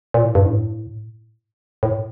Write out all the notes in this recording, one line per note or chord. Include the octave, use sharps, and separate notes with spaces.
A#2
A2
G2
A2
A2